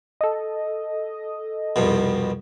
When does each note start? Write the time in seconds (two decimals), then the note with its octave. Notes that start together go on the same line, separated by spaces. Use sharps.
0.21 A4 D#5
1.76 C2 F2 B2